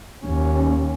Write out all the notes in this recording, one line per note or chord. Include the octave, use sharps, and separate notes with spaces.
D#2 C#4